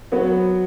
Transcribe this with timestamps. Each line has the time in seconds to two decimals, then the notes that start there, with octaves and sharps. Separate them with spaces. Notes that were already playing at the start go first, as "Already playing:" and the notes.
0.12 F#3 B3